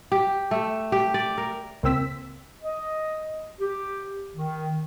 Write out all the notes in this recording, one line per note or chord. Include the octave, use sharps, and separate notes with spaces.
G4
A3
G4
D5
A#4
C#2 A#3 C4 E6 B6
D#5
G4
D#3